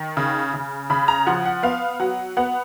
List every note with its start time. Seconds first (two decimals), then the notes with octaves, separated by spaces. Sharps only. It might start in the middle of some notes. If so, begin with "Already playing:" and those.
Already playing: D#3
0.17 C#3
0.54 C#3
0.90 C#3 B5
1.08 A#5
1.26 F3 F#5
1.45 F#5
1.63 B3 F5
2.00 F#3 F#5
2.37 B3 F#5